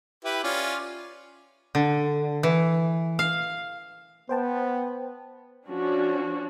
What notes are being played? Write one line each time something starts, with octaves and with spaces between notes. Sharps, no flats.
E4 G4 B4
C#4 F4 D5
D3
E3
F5
B3 C5 G5 A5
F3 C#4 D4 F#4